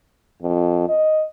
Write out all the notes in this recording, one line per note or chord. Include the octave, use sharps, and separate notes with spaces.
F2
D#5